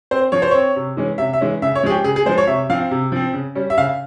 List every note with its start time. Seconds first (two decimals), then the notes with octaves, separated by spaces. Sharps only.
0.11 C4 C5
0.32 F3 C#5
0.42 C5
0.51 C4 C#5
0.76 C3
0.97 E3 G#3 C#4
1.18 C3 E5
1.33 E5
1.41 E3 G#3 C#4
1.62 C#3 E5
1.75 C#5
1.84 F3 G#3 G#4
1.90 G4
2.04 C#3 G#4
2.16 G#4
2.26 F3 G#3 C5
2.38 C#5
2.47 C3 E5
2.70 F3 F5
2.73 C4
2.91 C3
3.12 F3 C4
3.33 C#3
3.55 G3 C#4
3.70 E5
3.78 C#3 F5